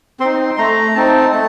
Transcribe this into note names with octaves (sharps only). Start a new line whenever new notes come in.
C4 D#4 C6
A3 A#5
C4 D#4 A5
A3 A5